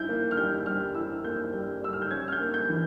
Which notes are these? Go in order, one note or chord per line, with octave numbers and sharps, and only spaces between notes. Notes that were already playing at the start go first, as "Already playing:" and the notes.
Already playing: E4 G6
A#3
F6
G3 G6
G3 F6
E4 E6
A#3 G6
G3
G3 E6
F6
G6
C#4 G#6
F6
G6
A#3
G6
E3